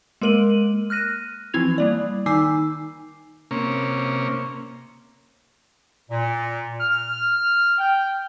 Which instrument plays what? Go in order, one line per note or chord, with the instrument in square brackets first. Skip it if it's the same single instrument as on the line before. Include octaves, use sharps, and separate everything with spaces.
[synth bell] G#3 A#3 A#4 D#7 F#7
F6 F#6 A#6 D#7
E3 F3 C4 E4 G#6 F7
G3 A#3 D5
D#3 D#4 G#5 D6 E6 C7
[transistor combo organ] C3 A#3 C#4
[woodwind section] A#2
F6
G5